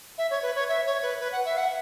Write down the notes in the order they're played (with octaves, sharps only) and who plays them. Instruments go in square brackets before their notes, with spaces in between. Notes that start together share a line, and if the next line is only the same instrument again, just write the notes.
[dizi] E5
C#5
B4
C#5
E5
C#5
B4
B4
F#5
E5
F#5